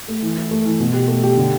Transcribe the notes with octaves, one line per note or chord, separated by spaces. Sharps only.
A3
E3
E4
A3
E3
B2
G4
A3
G4
D3